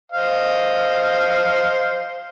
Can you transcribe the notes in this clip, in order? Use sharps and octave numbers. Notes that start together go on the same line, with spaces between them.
C5 D#5 F5